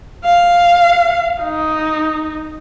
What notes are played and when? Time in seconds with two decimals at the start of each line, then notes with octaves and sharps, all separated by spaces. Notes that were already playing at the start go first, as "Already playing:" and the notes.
0.25 F5
1.42 D#4